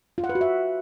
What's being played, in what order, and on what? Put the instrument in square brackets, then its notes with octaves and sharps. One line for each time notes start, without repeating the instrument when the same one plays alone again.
[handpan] F4
F#5
B4
F#4
E5